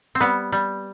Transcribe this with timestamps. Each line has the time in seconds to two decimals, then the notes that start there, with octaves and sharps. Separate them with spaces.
0.15 C4
0.20 G3 B3
0.52 G3